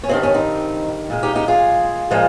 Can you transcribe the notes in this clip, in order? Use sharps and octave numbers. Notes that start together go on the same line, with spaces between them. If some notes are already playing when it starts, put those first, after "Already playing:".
C#4
G2 D#3 G3 C4
C#4
C4 D#4
A#2 G#3
D#4 G4
D#4 G4
F4 G#4
A#2 F3 G#3